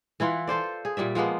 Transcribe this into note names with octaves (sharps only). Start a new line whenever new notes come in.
E3 E4 F4 F#5
F4 A4 C5 D5
G#4
A#2 G3 D5 E5
F3 G#3 A#3 B3